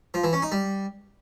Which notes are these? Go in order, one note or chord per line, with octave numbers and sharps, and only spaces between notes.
F3
E3
C#4
D#4
G3